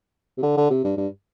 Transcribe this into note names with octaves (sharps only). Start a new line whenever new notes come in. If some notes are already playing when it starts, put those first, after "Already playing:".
C3
D3
D3
C3
G2
G2